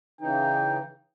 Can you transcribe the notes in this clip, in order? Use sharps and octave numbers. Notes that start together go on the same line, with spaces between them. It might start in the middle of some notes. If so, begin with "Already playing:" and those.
C#3 E3 D#4 G5